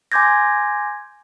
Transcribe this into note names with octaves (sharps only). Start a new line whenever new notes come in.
G#5 C6 D6 G6 G#6 A#6